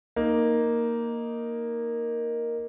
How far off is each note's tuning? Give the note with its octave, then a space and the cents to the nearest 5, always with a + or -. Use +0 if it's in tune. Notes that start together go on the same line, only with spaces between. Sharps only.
A#3 +0 D#4 +0